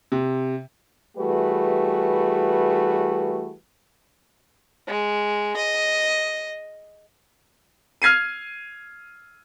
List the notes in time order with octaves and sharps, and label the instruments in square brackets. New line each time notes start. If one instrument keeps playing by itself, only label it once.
[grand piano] C3
[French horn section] E3 G3 A3 F#4 G#4 B4
[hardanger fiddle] G#3
D#5
[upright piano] F6 G#6 C7 D#7